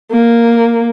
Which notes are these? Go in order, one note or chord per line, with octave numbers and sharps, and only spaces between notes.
A#3